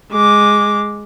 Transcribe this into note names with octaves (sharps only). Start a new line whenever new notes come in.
G#3 D6